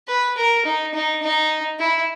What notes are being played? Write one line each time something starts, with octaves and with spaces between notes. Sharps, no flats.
B4
A#4
D#4
D#4
D#4
E4